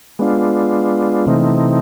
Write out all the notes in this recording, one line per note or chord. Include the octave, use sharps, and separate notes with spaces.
G#3 B3 D4 F4
C3 E3 A3 C4 D#4